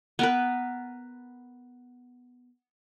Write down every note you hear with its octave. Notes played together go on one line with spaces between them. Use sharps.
B3 A#4 B4